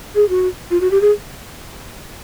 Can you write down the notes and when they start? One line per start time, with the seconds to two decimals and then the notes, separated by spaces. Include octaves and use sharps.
0.15 G#4
0.29 F#4
0.71 F4
0.81 F#4
0.91 G4
1.01 G#4